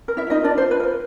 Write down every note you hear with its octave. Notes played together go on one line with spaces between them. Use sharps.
A#4
E4 E5
D#4 F4 D#5
D4 A#4 D5
C5
F4
B4
A#4 C5